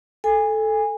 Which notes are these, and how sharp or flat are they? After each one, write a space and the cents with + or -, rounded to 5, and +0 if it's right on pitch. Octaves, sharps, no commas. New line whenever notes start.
A4 -10 G#5 -25